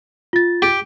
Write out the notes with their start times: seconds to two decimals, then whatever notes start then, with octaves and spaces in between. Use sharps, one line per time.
0.33 F4 A6
0.62 G4